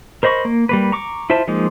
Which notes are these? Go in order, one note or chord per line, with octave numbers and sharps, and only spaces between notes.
A#4 C5 D#5 B5 C#6
A#3
G3 A#3 B4
A#5 C#6 D6
E4 F4 C5 E5 A5
F3 G#3 A#3 D#4